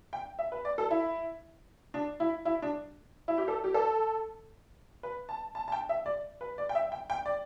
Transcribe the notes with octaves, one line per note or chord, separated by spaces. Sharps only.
G5
E5
B4
D5
A4
E4
D4
E4
E4
D4
E4
G4
A4
G4
A4
B4
A5
A5
A5
G5
E5
D5
B4
D5
G5
E5
G5
G5
D5